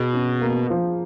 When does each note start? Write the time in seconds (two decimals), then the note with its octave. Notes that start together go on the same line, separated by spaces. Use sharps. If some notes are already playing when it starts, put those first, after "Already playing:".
Already playing: B2 G#4
0.13 C#4
0.41 A#3
0.70 F3